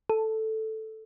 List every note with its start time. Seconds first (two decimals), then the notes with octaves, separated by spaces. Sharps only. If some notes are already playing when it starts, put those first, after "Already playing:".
0.10 A4